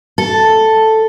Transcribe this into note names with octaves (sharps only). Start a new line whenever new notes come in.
A4